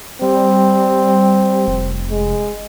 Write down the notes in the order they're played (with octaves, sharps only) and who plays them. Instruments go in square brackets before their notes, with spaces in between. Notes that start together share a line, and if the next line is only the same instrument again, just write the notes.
[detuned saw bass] G3 [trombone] C4
[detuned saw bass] F1
[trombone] G#3